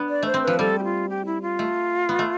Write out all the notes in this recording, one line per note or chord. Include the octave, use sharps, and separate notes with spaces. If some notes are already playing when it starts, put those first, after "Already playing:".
Already playing: B3 D4
D5
A3 C5
C4
F3 B4
G3 A4
G4
F4
G4
E4
F4
A3
B3
A3